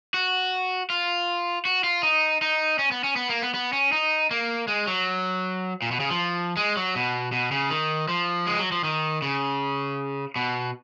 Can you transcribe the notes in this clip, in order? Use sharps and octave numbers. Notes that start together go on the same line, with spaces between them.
F#4
F4
F#4
F4
D#4
D#4
C#4
B3
C#4
B3
A#3
B3
B3
C#4
D#4
A#3
G#3
F#3
A#2
B2
C#3
F3
G#3
F#3
B2
B2
C#3
D#3
F3
G#3
F#3
F3
D#3
C#3
B2